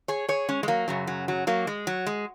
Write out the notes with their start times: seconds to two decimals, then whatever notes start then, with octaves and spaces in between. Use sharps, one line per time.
0.08 G#4 C#5
0.28 G#4 C#5
0.49 G#3 C#4
0.63 G#3
0.68 F#3 A#3
0.88 F#2 C#3 F#3
1.07 F#3
1.28 F#3
1.47 F#3 A#3
1.67 G#3
1.87 F#3
2.07 G#3